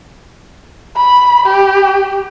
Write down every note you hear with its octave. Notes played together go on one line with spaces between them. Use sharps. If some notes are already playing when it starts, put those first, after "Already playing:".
B5
G4